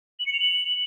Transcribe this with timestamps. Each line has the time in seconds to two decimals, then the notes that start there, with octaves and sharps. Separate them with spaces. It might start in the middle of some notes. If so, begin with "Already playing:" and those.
0.19 F#7
0.26 C#7
0.33 F7
0.40 F#7